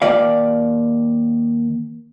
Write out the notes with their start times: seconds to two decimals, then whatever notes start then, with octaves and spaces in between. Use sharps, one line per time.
0.02 D#2 D5 F5